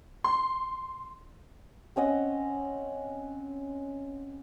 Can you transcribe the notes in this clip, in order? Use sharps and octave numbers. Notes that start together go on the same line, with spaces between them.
C6
C4 C#4 D#5 F#5